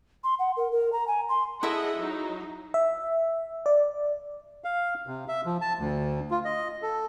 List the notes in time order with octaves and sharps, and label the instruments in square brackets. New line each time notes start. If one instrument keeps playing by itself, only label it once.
[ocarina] C6
F#5
A#4
A#4
A#5
G#5
C6
[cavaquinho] E4 A4 E5 [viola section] G#4 D#5 F#5
[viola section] F#3 D#4
[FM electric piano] E5
D5
[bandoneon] F5
C3
E5
F3
A5
D2
F4
D#5
A4